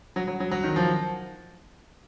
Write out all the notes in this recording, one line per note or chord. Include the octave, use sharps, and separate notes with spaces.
F#3
F#3
F#3
F#3
D#3
F3